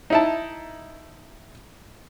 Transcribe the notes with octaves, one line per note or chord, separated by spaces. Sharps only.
D#4 E4 A5